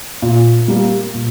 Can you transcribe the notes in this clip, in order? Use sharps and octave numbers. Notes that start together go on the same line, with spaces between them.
A#2
G3 A#3
A#2